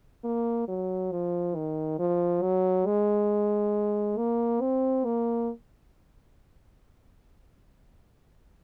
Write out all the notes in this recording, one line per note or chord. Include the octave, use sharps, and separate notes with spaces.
A#3
F#3
F3
D#3
F3
F#3
G#3
A#3
C4
A#3